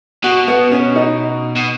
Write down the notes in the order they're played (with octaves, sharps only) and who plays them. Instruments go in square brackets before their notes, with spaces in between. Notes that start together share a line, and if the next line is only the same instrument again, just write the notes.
[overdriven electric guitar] B2 [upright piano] F#4
[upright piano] B3
C#4
D#4
[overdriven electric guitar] B2